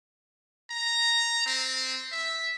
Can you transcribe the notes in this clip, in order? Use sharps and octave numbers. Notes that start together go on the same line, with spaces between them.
A#5
C4
E5